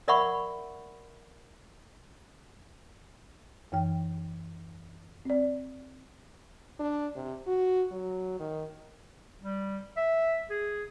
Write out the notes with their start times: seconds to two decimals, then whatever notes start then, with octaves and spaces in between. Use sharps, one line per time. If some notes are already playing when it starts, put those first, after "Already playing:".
0.08 A#4 D5 E5 F#5 B5 C#6
3.72 F#2 E3 G5
5.25 C4 D5
6.79 D4
7.16 C3
7.47 F#4
7.91 F#3
8.40 D#3
9.41 G3
9.97 E5
10.50 G#4